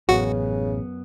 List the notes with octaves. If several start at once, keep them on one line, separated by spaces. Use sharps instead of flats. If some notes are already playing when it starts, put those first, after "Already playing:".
A1 F#2 C#3 B3 F#4